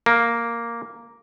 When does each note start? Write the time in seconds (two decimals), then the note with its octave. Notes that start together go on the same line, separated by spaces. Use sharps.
0.06 A#3